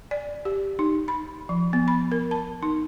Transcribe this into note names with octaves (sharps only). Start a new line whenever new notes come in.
D5
G4
D#4
B5
F3
B3
B5
A#4
A5
D#4